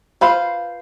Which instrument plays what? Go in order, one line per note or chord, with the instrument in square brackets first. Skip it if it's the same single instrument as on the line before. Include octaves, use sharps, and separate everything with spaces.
[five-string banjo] F4 B4 C5 F5